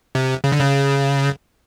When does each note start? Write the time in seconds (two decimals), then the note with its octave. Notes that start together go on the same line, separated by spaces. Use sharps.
0.15 C3
0.44 C#3
0.52 D3
0.60 C#3